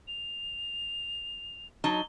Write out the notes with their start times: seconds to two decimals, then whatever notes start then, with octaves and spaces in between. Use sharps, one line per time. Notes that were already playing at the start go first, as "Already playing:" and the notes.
0.08 F7
1.84 F#3 D#4 A5 G7